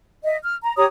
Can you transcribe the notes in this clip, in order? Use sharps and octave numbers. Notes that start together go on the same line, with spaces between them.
D#5 E5
F6
A#5
G4 C#5 A#5 D#6